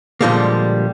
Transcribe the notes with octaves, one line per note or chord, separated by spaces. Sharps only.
A#2 D3 F3 G3 G#3 A#3